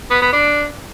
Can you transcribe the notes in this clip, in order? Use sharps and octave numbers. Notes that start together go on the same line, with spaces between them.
B3
B3
D4